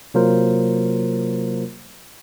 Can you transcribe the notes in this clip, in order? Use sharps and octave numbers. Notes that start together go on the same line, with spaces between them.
C3 F#3 A#3 F4 A#4 C5